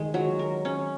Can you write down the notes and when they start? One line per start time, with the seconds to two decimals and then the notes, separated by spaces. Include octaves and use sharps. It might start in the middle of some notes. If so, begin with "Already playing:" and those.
Already playing: D#3 G#3
0.14 F#3
0.39 A#4
0.65 C#4